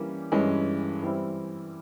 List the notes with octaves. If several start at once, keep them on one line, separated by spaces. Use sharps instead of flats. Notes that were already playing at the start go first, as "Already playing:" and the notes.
Already playing: E3 G3 A#3 C#4
G2 E3 G#3 C#4
E3 G3 C4 E4